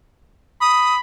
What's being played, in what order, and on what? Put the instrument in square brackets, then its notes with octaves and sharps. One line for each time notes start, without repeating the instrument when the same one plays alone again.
[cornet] B5 [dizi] D#6